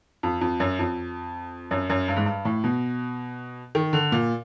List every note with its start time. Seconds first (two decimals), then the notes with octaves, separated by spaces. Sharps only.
0.23 F2
0.41 F2
0.60 F#2
0.79 F2
1.71 F#2
1.90 F#2
2.08 G2
2.17 G#2
2.26 G2
2.45 A2
2.64 B2
3.75 D#3
3.93 D3
4.12 A#2